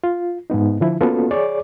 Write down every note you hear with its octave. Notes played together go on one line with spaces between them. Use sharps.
F4
G#2 G#3 B3 D#4
D3 F3 E4
A#3 B3 C#4 F4 F#4 A4
G#4 C#5 D5 D6